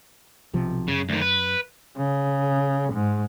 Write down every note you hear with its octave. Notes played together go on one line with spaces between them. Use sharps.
B1 C3 F3
F#2 C#3
D2 D#3
B4
C#3
G#2